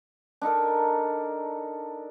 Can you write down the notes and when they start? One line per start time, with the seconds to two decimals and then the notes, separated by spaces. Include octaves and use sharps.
0.41 D4 D#4 A4 A#4